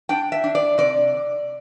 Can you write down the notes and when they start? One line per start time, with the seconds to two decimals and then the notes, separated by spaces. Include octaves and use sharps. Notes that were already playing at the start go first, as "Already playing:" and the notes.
0.09 D4 G5
0.32 E5
0.44 D4
0.55 D5
0.78 C3 D5